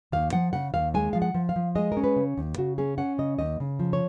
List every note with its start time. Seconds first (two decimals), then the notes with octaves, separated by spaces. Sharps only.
0.12 D#2 F5
0.33 F3 F#5
0.53 C#3 F#5
0.74 D#2 F5
0.94 G#3 G#5
1.13 F3 F5
1.22 F#5
1.34 F3
1.49 F5
1.56 F3
1.75 G#3 D#5
1.92 A#4
1.97 C#4
2.04 B4
2.16 C#3
2.38 D#2
2.58 C#3 F#4
2.78 C#4 G#4
2.98 C#4 F#5
3.18 C#3 D#5
3.39 D#2 D#5
3.60 C#3
3.79 F3
3.93 C#5